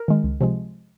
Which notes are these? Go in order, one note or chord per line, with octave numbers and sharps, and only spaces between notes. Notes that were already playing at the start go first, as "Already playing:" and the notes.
Already playing: A#4
D#3 G#3
C#2
C3 F3 G#3